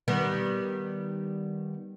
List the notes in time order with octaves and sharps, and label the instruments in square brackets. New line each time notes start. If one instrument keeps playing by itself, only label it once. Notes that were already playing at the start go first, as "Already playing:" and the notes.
[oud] D#3 G3 B3